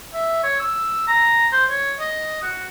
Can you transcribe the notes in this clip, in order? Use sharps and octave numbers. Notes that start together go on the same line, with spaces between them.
E5
C#5
E6
A#5
C5
C#5
D#5
F#4